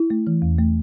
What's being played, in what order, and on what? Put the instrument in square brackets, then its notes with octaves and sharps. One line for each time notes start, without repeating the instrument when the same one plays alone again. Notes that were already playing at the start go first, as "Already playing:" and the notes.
Already playing: [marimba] E4
A3
E3
E2
A3